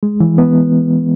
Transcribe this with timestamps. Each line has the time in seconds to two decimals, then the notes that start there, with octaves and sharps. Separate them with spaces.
0.03 G#3
0.20 E3
0.38 B3